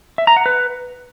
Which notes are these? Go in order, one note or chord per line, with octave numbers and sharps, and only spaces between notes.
E5
A#5
F#5
B4